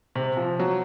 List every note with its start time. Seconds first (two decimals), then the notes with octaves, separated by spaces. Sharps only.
0.16 C3
0.37 F3
0.59 F#3